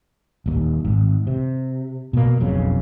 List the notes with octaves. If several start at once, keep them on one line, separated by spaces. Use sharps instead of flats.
D#1 D#2
G#1
C3
B2 A#3
F#1 B1 F2 C#3